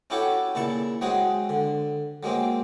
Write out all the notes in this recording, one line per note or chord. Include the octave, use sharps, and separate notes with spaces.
C#4 E4 F#4 G4 A4 C#5
A#2 C#3 E4 A5 C#6
F#3 G#3 C4 F#4 G#4
D3
F#3 G#3 A#3 C4